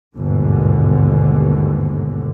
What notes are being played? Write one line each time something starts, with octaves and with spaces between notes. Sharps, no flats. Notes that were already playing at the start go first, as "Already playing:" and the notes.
G1 D#2 G#2 B2 D3